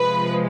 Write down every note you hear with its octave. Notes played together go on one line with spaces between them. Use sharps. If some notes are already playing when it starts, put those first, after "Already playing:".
Already playing: C3 F3 G#3 B4